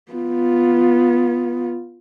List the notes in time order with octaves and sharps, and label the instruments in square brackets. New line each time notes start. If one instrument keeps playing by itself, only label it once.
[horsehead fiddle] B3 F4